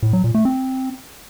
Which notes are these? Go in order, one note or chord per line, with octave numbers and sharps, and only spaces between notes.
A2
F#3
A#2
A3
C4